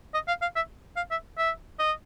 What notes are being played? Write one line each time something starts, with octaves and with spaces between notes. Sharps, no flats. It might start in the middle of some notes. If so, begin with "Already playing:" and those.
D#5
F5
F5
E5
F5
E5
E5
D#5